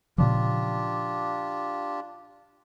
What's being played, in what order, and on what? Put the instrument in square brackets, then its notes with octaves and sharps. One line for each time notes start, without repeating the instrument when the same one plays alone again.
[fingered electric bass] A#2 C#3 F3 [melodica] D4 F4 G4